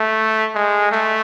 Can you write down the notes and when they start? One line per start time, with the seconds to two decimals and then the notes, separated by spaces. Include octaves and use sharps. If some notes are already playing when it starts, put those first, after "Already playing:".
Already playing: A3
0.55 G#3
0.91 A3